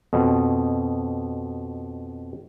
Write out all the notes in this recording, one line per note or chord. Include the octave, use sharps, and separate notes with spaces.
F2 B2